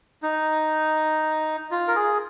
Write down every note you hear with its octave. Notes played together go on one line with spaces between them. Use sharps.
D#4
F4
A#4
G#4